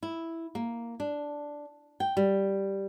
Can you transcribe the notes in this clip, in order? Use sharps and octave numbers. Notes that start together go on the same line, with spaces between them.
E4
A#3
D4
G5
G3